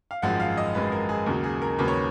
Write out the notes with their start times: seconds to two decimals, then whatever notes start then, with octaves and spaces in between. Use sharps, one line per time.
0.11 F5
0.22 G#1 F#2 F3 G#3 F#5
0.40 F5
0.57 D#5
0.75 G#1 F#2 F3 G#3 B4
0.92 A#4
1.09 G#4
1.26 D#2 C#3 F#3 A#4
1.44 G#4
1.62 A#4
1.79 D#2 C#3 F#3 B4
1.88 C#5